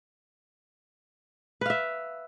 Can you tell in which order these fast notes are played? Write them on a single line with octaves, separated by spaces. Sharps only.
B4 F5 E5